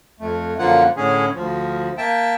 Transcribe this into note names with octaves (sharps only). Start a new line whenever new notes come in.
F2 A3
F#2 D3 F3 A#3 F4 F#5
A2 D3 C#4 G#4
D2 F3
A#3 E5 G5 A5